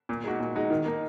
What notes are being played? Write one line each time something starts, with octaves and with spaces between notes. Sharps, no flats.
A#2
G#3 D#4 F#4
A#2
G#3 D#4 F#4
D#3
A#3 D#4